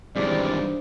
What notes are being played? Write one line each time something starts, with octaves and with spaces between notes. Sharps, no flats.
G2 C3 D#3 E3 G#3 D4 C5 D5